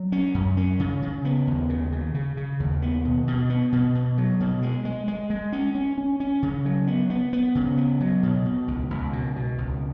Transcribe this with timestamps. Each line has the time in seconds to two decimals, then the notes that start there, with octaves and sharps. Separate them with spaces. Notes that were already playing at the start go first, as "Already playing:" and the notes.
Already playing: F#3
0.12 C#4
0.34 F#2
0.57 C#4
0.80 C#3
1.02 C#3
1.25 B3
1.47 D#2
1.70 C#3
1.92 C#3
2.15 C#3
2.37 C#3
2.60 D#2
2.82 B3
3.05 B2
3.28 B2
3.50 B3
3.72 B2
3.95 B2
4.18 F#3
4.40 B2
4.62 G#3
4.85 G#3
5.08 G#3
5.30 G#3
5.52 C#4
5.75 C#4
5.98 C#4
6.20 C#4
6.43 C#3
6.65 F#3
6.87 B3
7.10 B3
7.33 B3
7.55 C#3
7.77 B3
8.00 F#3
8.23 B2
8.46 B2
8.68 C#2
8.90 C#2
9.13 B2
9.36 B2
9.58 C#2